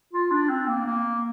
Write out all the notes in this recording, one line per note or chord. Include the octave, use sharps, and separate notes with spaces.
F4
D4
C4
A#3
A#3